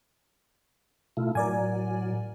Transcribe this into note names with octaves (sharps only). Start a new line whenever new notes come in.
B2 A3 E4 F4
A2 F#3 A#4 D5 G#5